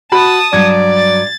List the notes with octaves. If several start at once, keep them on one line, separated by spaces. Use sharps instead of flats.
F#4 A5 B5 D#6
G2 F#3 D5 G#6
A6